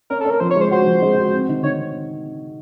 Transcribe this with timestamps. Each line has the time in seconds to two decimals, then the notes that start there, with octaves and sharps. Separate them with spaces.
0.10 C#4 A#4
0.21 A4
0.25 C#4 A#4
0.40 F3 C5
0.51 C#5
0.56 G#3 C5
0.71 F#4 C5
0.86 F3
1.02 G#3
1.17 F#4
1.33 C4
1.49 D#3
1.63 D#3 C#5